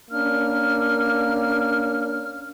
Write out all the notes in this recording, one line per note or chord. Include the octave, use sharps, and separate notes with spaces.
A#3 C#4 D4 F6